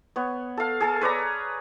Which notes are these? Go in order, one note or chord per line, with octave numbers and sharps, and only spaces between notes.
B3 C#5
A4 F5
G#4 A4 A5
B4 C#5 D5 A#5